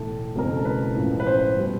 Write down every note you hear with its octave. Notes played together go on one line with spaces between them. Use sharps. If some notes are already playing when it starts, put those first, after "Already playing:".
Already playing: B1 A2 E3 A4
F#1 E2 B2 G#3 C4 A#4
A4
B4
A1 A2 F3
B4
C5
B2 G3